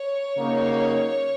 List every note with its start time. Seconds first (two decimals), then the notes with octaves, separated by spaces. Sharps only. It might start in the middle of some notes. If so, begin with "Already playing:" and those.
Already playing: C#5
0.36 C#3 F#3 A#3 D#4